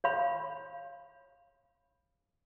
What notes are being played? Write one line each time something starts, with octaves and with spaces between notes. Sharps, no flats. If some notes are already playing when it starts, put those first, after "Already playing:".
C#5 F5 B5